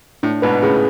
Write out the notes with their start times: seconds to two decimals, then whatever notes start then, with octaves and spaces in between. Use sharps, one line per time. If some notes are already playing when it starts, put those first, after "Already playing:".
0.23 A2 D4
0.42 G#2 B2 B4
0.62 A2 C#3 G#4